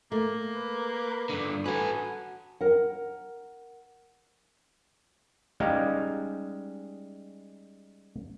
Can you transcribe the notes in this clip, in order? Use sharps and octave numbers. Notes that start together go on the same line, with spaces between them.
A3 A#3
B4
G2 D3
F#4 A4 B4 G#5
A#4 F#5
G3 G#3 C#4 D#4 F5 G5